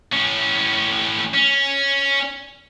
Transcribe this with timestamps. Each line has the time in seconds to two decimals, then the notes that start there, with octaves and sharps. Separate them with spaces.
0.13 A2 C#4
1.34 C#4